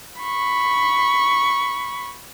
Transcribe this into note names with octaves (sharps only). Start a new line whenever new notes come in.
B5 C#6